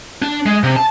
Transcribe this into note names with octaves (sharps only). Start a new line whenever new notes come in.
D4
G#3
C3
A5